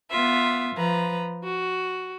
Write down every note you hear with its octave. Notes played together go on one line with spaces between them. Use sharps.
B3 F4 E5
F3 B4 A#5
F#4